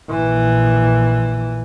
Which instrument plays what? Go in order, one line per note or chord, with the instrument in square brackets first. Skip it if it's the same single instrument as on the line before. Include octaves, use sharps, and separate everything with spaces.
[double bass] A#1 E3